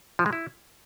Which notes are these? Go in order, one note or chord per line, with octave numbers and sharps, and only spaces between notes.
F3
G#3
E4